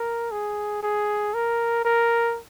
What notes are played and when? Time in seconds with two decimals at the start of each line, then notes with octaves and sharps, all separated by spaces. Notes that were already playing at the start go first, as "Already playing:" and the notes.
Already playing: A#4
0.32 G#4
0.83 G#4
1.34 A#4
1.85 A#4